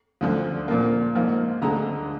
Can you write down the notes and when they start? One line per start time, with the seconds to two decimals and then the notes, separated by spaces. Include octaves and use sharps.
0.21 D2 D3 F3
0.68 A#2 F3 A#3
1.15 G#2 F3 A#3
1.62 D2 D3 G#3 A#5